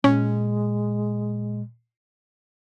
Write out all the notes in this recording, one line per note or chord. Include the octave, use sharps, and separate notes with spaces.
A#2 G#3 C#4